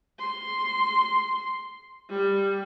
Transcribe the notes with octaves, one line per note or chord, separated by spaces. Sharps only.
C6
G3